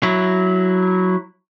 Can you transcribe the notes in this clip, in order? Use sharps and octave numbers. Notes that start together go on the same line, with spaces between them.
F#3 E4